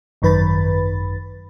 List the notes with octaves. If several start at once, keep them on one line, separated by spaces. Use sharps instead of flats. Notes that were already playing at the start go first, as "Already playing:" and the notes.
G#1 F#2 D#3 B4 B5 A6